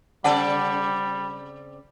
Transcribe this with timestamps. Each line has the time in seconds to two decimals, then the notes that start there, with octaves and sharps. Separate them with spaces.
0.24 C#3 G3 C4 D5 F#5 A5